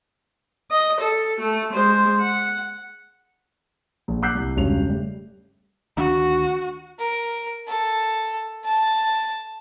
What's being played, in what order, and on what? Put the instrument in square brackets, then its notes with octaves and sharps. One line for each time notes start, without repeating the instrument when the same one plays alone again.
[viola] D#5
A4
A3
G#3 C5
F#5
[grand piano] A#1
F#5 D6 E6 F#6 G6 C7
C2
E1 G2 C#3 C#4 F7
G3 A3
[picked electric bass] D2 D#3 D4 [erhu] F#4
[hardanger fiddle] A#4
A4
A5